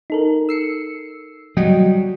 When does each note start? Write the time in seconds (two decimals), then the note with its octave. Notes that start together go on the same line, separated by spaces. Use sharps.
0.10 D#4 A4 A#4
0.49 E6 C7 C#7
1.57 F#3 G3 F#4 D#5 G5